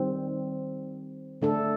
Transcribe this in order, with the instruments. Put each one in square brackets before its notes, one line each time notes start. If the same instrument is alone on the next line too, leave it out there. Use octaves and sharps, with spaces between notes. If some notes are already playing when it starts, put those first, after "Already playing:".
Already playing: [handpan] D#3 G3 C4
D3 A3 D4 A4